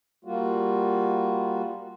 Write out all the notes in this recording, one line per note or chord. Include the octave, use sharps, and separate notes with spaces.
G3 A#3 F4 F#4